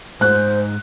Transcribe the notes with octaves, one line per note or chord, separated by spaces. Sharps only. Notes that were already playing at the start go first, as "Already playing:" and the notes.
G#2 C5 F#6